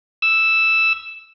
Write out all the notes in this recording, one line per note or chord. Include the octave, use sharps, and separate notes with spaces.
E6